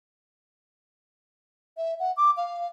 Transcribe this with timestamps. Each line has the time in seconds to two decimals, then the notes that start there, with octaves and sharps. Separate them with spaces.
1.77 E5
2.00 F#5
2.17 D6
2.37 F5